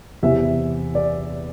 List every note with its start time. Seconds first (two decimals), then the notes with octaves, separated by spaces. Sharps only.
0.23 E2 C3 E3 E5
0.95 D5